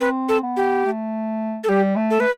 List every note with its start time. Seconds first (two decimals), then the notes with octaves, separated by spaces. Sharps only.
0.01 C4 B4
0.29 A4
0.43 B3
0.56 G4
0.86 A3
1.64 A4
1.69 G3 G4
1.96 A3
2.10 A4
2.20 A3 B4